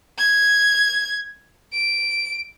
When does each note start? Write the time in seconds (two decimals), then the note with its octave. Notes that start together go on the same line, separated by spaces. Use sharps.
0.19 G#6
1.73 D7